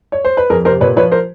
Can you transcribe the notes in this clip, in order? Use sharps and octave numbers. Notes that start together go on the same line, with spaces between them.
C#5
C5
B4
F2 G#4 A#4
C3 A#4 C5
A#2 B4 C#5
F3 B4 C#5
A#4 C5